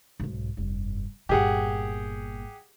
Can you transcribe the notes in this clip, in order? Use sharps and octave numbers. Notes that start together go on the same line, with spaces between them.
B1 G#2
F1 G2
G1 A#2 G4 G#4 F#5